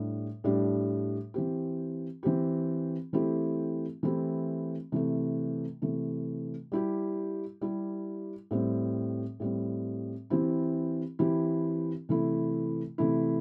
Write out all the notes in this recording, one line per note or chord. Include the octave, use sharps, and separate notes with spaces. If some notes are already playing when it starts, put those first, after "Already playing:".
Already playing: A2 G3 D4 G4
A2 G3 D4 G4
E3 C4 G4
E3 C4 G4
E3 A3 C4 E4 G4
E3 A3 C4 E4 G4
C3 E3 A3
C3 E3 A3
G3 E4 G4
G3 E4 G4
A2 G3 C4
A2 G3 C4
E3 C4 E4 G4
E3 C4 E4 G4
C3 E3 A3 E4
C3 E3 A3 E4